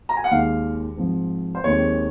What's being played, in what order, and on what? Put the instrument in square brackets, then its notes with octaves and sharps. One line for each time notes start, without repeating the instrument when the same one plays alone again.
[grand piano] A#5
G#5
F#5
D#2 D#3 G#3 F5
G#2 F3 C4
C5
D#2 D#3 G#3 C4 C#5